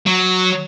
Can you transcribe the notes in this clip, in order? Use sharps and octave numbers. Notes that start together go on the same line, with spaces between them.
F#3